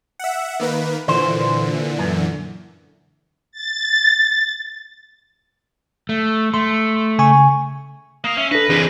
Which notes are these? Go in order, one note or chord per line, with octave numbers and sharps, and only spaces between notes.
E5 F#5
D#3 A#3 B4
A#2 D3 E3 C5
F#2
A6
A3
A3 C6
C#3 G#5 C#6
A#3 F5 D#6
C#4 E5
D4 A4 B4 A#6
E3 C4 G#4